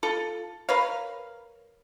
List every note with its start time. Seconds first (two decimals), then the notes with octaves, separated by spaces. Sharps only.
0.03 F4 A4
0.69 A#4 B4 C#5 F5